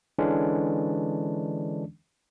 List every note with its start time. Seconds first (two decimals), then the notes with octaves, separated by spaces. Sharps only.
0.18 D3 E3 G#3 C#4 D4